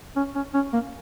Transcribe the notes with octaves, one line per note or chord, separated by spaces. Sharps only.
C#4
C#4
C#4
A#3